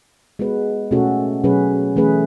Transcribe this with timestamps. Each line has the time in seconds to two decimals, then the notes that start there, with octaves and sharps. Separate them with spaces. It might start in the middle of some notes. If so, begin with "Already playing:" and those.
0.39 G#3 B3 F#4 B4
0.91 B2 A3 C#4 F#4 A4
1.44 B2 F#3 C#4 G#4 B4
1.96 E3 A3 C#4 G#4 B4